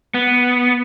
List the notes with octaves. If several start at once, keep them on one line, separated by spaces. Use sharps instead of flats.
B3